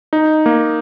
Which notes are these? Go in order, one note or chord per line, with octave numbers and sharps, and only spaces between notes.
D#4
A#3